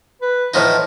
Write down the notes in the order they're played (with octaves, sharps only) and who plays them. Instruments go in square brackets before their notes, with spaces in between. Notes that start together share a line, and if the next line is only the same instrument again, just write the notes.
[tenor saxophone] B4
[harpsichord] A2 F3 D#4 [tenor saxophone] E3